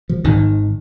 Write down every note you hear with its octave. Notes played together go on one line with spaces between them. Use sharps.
F3
G#1 G#2 D#3